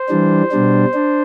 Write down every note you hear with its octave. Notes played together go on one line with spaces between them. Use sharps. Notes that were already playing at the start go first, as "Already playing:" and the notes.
Already playing: C5
E3 G3 D4
B2 G3 D4
D4